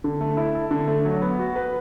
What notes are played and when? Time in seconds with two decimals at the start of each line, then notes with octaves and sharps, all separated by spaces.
0.04 D3
0.21 A3
0.37 E4
0.55 A4
0.71 D3
0.88 A3
1.05 F#3
1.22 B3
1.39 F#4
1.56 B4